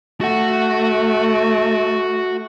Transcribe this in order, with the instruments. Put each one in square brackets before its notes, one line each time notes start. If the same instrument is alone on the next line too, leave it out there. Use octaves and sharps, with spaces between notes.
[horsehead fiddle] A3 [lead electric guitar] F#4 F#5